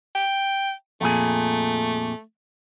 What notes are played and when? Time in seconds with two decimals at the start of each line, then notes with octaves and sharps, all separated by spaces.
0.15 G5
1.01 F2 A#2 A3 G#4